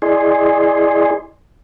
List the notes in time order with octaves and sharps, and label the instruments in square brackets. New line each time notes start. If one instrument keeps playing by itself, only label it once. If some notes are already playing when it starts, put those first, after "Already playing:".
[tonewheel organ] E4 G#4 D5 D#5 G#5 C6